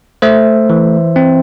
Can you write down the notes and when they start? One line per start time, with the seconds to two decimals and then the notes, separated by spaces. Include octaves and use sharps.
0.22 A3 C5 E5
0.70 E3
1.16 C4